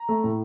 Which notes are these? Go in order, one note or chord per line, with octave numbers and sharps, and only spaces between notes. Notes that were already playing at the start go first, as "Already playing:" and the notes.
Already playing: A#5
A3
A2